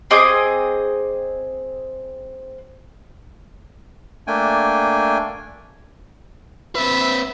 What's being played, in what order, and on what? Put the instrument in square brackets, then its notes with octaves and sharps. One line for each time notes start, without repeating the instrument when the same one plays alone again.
[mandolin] C4 G#4 D#5 D6
[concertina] A3 A#3 D4 G5 G#5
[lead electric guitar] C4 B4 [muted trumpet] E5